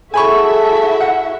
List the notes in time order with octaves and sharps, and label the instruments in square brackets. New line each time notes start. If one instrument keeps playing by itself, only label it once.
[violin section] E4 F#4 E5 [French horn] G#4 [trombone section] A4 [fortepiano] G#5 B5 C#6
[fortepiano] F#5